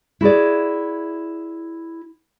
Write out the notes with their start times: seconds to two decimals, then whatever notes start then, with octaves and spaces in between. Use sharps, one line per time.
0.21 E4 F#4 G#4 D5